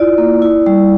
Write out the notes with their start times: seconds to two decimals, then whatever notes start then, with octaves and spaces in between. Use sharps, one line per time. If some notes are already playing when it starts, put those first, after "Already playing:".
Already playing: E4 F4 D5
0.18 A#3
0.42 E4
0.66 G3